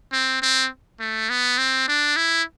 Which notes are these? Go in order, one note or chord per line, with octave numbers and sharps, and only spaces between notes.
C4
C4
A3
B3
C4
D4
E4